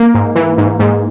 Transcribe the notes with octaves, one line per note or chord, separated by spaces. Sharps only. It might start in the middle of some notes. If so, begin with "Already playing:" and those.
Already playing: A#3
G#2
E3
G#2
G#2